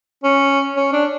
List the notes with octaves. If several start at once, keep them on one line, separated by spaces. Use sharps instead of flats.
C#4
C#4
D4